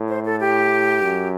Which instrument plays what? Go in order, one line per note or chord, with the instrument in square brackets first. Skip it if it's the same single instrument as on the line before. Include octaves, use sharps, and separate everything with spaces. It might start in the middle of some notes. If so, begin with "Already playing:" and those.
Already playing: [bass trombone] A2
[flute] C5
A4
G4
[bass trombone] F#2